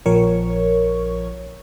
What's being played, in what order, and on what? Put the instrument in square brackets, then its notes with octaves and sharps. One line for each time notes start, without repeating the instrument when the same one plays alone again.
[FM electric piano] A#1 F3 A#4 C#5 C#6